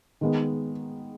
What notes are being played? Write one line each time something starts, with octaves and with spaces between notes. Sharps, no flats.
D#3 G#3 B3